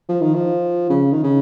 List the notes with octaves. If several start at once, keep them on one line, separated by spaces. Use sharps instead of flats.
F3
D#3
F3
C#3
D#3
C#3